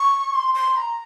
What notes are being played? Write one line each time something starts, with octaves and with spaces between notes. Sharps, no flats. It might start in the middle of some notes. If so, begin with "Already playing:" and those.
Already playing: C#6
C6
C6
A#5